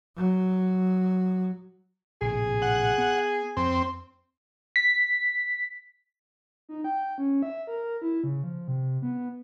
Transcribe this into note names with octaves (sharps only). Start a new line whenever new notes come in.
F#3
A#1 A2 C3 G#4
F#5
B3
F2 C4
B6
D#4
G5
C#4
E5
A#4
E4
C#3
F3
C3
B3